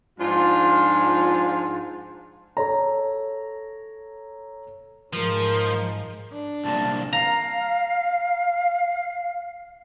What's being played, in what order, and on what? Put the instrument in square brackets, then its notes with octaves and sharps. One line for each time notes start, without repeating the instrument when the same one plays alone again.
[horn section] G#2 F3 D4 F4
[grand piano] A4 C#5 A#5
[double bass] G#2 G#3 [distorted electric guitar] F3 [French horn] A#4
[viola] D4
[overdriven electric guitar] C2 A#2 [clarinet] A5
[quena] F5 [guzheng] A#5